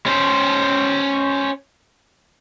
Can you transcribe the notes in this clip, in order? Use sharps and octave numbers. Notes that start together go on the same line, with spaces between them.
C#4 C5